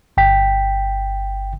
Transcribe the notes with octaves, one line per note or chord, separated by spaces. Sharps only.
G1 G5 B6